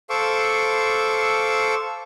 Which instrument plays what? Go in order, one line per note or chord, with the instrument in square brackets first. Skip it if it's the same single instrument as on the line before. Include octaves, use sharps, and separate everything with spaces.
[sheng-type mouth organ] A4 C5 F5 C#6 D6 E6